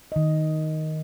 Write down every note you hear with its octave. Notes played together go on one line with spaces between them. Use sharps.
D#3 D#5